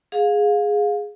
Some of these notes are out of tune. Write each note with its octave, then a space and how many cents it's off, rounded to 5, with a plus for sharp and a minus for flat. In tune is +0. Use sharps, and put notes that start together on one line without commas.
G#4 +0 F5 +20